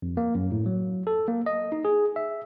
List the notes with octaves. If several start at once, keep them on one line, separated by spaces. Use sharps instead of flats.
F2
A#3
F#2
A2
F#3
A4
A#3
D#5
D#4
G#4
E5